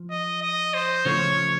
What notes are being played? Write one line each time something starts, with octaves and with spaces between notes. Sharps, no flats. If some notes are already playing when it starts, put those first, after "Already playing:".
Already playing: F3
D#5
D#5
C5
C#3 F3 A3 C#5